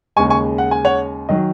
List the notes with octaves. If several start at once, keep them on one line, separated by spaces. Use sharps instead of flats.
D#2 C#3 G#3 G#5 C#6
G#5 C#6
F#5
G#5
C#5 F#5
D#3 F#3 D#5